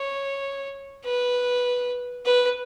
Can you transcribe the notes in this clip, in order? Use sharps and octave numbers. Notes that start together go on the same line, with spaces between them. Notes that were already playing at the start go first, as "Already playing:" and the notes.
Already playing: C#5
B4
B4